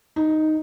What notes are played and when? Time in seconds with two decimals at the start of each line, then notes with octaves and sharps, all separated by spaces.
0.16 D#4